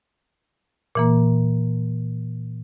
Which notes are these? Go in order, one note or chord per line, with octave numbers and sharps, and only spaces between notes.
A#2 E3 A#3